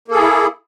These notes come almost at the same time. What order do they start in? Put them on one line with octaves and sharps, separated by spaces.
A#3 A4 G#4 E4